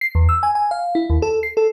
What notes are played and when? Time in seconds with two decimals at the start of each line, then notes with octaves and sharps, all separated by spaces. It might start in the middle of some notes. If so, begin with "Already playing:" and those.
0.01 C7
0.15 E2
0.29 E6
0.43 G#5
0.55 G#5
0.71 F5
0.95 E4
1.10 D#2
1.22 A4
1.43 C7
1.57 A4